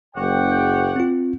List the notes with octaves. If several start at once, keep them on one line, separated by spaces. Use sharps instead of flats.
F#1 C#5 D5 F#5 G5
C4 F4